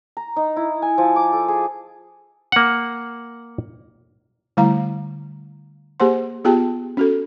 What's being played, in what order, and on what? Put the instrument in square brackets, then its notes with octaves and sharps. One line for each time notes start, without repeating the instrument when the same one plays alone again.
[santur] A#5
D#4
E4
G#5
F3
D6
A4
G#4
[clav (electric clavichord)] A#3 F#5
[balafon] D3 G3 A3 E4 F5 A#5
A#3 G4 G#4 C5 F#5 C6
B3 F4 G4 G#4 G5 A5
C#4 F#4 A4